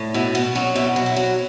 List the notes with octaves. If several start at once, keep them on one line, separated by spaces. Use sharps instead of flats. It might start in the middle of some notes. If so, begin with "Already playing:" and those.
Already playing: A2
B2 E4
B2 B3
F#3 C#4
B2 E4
F#3
E4
F#3